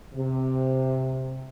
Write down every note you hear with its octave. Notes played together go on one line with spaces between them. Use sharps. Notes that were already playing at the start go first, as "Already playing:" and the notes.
C3